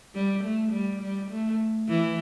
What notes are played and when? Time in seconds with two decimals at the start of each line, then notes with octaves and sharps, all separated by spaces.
0.15 G3
0.44 A3
0.72 G3
1.01 G3
1.31 A3
1.89 E3